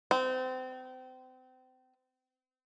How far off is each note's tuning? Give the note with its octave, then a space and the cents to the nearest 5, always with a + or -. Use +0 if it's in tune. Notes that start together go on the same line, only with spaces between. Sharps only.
C4 -30